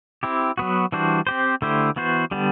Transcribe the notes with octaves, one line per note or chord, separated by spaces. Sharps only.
C4 E4 G4
F#3 B3 F#4
E3 G3 D4 F#4 C5
C4 G4 C5
D3 A3 E4 G4 C5
E3 B3 F#4 C5
D3 G3 B3